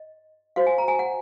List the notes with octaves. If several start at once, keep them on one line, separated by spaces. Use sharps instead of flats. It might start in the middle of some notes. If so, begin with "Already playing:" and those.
Already playing: D#5
F#4 C5 F5
G#5
A#5
G#5
F#5